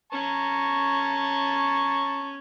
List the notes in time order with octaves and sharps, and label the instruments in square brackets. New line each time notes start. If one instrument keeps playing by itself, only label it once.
[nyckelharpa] C#4 [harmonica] A5 A#5 C#6